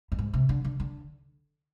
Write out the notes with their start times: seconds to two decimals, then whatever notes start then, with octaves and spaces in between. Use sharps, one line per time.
0.12 G2
0.19 G#2
0.34 C3
0.49 D3
0.65 D3
0.80 D3